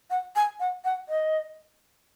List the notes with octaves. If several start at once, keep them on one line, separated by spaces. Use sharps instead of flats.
F#5
G#5
F#5
F#5
D#5